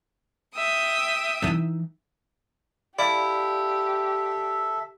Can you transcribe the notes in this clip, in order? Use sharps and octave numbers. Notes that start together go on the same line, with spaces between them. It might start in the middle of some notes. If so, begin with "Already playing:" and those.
E5 G5 D#6
E3 D#4
E4 G4 A4 D5 E5 F5 B5